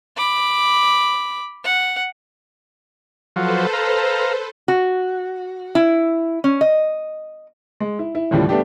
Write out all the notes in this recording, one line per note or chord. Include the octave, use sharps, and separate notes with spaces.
B5 D6
F#5
F3 F#3 A4 B4 C5
F5 A#5
F#4
E4
C#4
D#5
G#3
E4
E4
A1 D#2 A2 C#3 F3 G3
G3 A3 B3 D4 G4